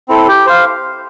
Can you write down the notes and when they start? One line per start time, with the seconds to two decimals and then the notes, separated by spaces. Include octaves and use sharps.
0.09 C4 E4 A4
0.28 G4
0.46 C5 F5